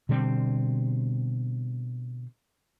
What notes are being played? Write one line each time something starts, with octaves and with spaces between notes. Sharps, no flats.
B2 D3 G3 C4